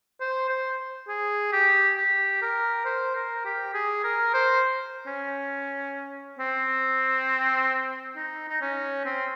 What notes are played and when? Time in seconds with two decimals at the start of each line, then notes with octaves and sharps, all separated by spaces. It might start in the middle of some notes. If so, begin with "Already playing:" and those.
0.20 C5
0.49 C5
1.08 G#4
1.52 G4
1.97 G4
2.42 A#4
2.85 C5
3.15 A#4
3.45 G4
3.74 G#4
4.04 A#4
4.34 C5
5.07 C#4
6.39 C4
8.17 D#4
8.49 D#4
8.61 C#4
9.05 C4